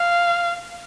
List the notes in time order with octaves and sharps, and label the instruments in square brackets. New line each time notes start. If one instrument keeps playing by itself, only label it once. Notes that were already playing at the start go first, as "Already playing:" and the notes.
Already playing: [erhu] F5